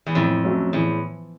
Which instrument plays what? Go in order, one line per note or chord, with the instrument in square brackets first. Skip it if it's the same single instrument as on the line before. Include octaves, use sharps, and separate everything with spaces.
[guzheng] E2
[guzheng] F2 [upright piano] A2
[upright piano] F#3 A3 C#4 F#4
[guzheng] E2 [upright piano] A2